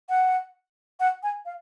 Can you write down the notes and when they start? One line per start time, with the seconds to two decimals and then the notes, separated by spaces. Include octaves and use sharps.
0.09 F#5
1.00 F#5
1.23 G#5
1.45 F5